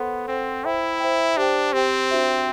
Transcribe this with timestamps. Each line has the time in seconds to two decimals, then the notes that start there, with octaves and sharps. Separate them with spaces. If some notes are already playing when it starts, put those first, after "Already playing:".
Already playing: B3 A4 C5 F#5 C6
0.28 C4 A4 C5 F#5 C6
0.65 E4 C5 E5 G5
1.00 C5 E5 G5
1.37 D4 G4 C5 G5
1.73 C4 G4 C5 G5
2.10 D4 F#4 C5 E5 G5